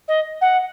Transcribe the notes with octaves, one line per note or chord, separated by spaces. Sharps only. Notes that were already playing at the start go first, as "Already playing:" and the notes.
D#5
F#5